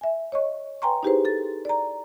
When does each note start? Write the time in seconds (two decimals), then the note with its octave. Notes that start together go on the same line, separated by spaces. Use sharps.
0.01 E5 G#5
0.32 C#5 D#5 C#6
0.82 B4 G5 G#5 A#5 C6 C#6
1.03 D#4 E4 G4 G#4 B4 C5
1.25 A4 A6
1.65 D5 A#5